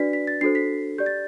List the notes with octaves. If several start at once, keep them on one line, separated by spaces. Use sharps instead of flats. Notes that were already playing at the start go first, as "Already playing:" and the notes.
Already playing: D4 F#4 B4 D5 B6
B6
A6
D4 F#4 A4 C5 C7
B6
G4 D5 G6
A6